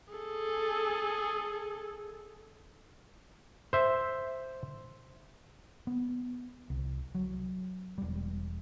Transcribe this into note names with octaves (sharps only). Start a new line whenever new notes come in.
G#4 A4
C5 E5
B3
C2
F#3
E1 G3